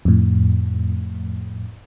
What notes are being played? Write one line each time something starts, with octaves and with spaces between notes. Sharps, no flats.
F2 A2